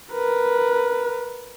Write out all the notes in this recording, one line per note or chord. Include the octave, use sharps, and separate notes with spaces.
A#4 B4